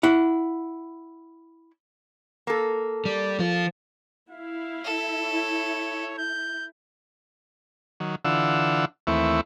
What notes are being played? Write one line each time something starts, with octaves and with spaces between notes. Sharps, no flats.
E4 F#5
A#3 A4
G3
F3 F4
E4 F5
A4
C#5
G6
D#3 F#3
D3 E3 D4 F4 F#5 E6
D#2 E3 A3 C4 E4 C#6